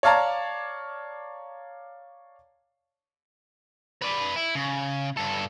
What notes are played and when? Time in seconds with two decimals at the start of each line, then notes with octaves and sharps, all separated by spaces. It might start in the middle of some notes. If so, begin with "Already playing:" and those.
0.03 C#5 D5 F5 A5 A#5
4.02 B4 D5
4.36 E4
4.55 C#3
5.17 G2 A4